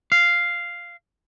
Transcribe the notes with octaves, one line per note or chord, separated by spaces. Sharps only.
F5